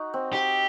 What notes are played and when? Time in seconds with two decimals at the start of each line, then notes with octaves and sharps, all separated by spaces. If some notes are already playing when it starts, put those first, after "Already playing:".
Already playing: D#4 F#4
0.14 C4
0.33 G4